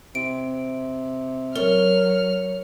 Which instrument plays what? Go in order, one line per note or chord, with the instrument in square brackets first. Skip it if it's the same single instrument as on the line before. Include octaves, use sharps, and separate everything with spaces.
[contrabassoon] C3 [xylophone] D7
[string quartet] F#3 F6 [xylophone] A#4 [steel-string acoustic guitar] C#5